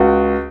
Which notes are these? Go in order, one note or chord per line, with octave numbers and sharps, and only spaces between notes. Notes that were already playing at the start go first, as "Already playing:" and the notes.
Already playing: C#2 F#4